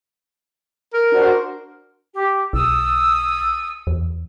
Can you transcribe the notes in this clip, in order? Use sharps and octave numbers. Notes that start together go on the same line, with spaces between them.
A#4
D4 F#4 C5
G4
B1 D#6 E6
E2